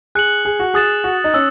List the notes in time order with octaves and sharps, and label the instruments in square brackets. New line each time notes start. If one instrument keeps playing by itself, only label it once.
[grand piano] G#4 [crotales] F#6 C#7 F#7
[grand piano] G#4
F#4
[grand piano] G#4 [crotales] D#6 F#6 A6 E7
[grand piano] F#4
D#4
[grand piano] C#4 [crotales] E6